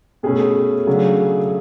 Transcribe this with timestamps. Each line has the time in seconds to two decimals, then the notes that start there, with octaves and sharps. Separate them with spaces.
0.23 B2 A3 C#4 G#4
0.87 C#3 F#3 A3 D4